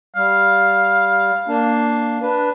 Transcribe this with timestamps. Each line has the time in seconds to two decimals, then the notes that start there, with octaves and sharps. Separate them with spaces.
0.16 G3 F5
1.48 A#3 D4
2.22 D4 B4